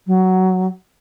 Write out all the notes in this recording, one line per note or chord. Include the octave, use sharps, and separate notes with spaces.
F#3